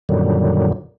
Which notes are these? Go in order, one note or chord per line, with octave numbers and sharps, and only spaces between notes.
F#2 A#2 D3 D#3 F#3 G3